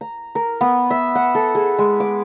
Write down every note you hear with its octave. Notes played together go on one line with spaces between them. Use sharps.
A#5
A#4
B3
E5
F#5
A4
G#4
G#3
D6